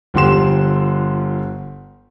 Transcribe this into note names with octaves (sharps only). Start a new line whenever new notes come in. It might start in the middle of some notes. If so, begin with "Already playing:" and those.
G1 D3 F3 G4 C6 E7